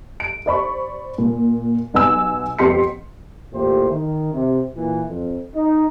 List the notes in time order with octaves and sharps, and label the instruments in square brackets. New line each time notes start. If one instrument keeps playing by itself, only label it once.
[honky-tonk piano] D7
C5 D5 B5 C#6
A#2
B1 B3 G#5 E6
F2 B3 G4 C6 B6 C#7
[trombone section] A1 E2 A#2 A3 G4 C5
D#3
C3
A#2 E3
F2
D#4